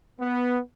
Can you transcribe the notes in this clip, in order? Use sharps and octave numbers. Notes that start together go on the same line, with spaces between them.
B3